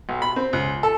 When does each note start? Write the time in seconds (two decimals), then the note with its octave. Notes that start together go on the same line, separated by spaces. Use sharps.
0.09 B1
0.22 B5
0.36 C4
0.53 C#2
0.83 A4